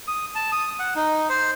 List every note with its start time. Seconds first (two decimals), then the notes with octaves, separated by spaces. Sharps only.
0.08 D#6
0.35 A5
0.52 D#6
0.79 F#5
0.96 D#4
1.29 C5